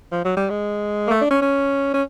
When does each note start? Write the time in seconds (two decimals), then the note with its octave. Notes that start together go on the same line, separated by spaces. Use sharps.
0.12 F3
0.25 F#3
0.37 G3
0.50 G#3
1.07 A#3
1.10 A3
1.21 D4
1.31 C#4
1.42 C#4
1.94 C#4